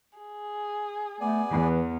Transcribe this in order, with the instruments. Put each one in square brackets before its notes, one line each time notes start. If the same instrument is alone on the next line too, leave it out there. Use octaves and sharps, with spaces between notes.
[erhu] G#4
[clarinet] A3 [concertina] B3 D5 G#5
[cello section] E2 [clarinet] E3